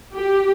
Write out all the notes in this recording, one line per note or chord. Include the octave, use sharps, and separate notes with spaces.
G4